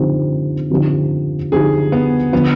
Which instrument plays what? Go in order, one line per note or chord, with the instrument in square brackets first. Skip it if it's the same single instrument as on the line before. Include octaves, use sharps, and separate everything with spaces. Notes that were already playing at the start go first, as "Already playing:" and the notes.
Already playing: [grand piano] D3 F3 C4 D#4 G4
D3 F3 C4 D#4 G4
[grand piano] D3 F3 C4 D#4 G4 [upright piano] G#4
[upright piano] B3
[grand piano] D3 F3 [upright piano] B3